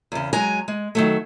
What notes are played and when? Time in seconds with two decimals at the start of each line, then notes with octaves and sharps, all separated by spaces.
0.12 E2 C#3
0.33 F#3 G#3 G#5 A#5
0.68 G#3
0.95 D#3 F#3 A3